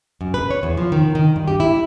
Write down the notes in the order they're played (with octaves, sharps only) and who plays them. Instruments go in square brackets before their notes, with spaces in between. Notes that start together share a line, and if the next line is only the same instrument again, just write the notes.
[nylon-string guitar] F#2
B4
C#5
E2
F3
D#3
D#3
G2
G4
E4